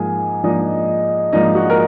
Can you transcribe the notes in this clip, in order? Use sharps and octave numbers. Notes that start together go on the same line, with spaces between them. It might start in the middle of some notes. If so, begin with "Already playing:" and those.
Already playing: G#2 F3 A#3 G#4 G#5
G#2 F3 A#3 D4 D#4 D#5
G#2 F3 A#3 D4 D#4 D#5
F#4
A#4